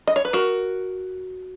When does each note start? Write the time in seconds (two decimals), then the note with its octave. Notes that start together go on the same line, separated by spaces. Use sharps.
0.07 D#5
0.16 C#5
0.25 B4
0.33 F#4 A#4